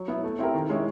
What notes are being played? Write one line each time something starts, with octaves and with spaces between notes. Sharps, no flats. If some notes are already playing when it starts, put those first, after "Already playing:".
Already playing: F#3
B3 E4
A3
C4 E4 G4 A#4
D#3
G#3 C#4 E4